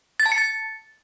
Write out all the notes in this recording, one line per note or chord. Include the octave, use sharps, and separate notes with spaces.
A6
A5
C#7
A6